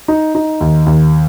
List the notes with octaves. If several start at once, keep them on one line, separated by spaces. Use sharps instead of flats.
D#4
D#4
D#2
D#2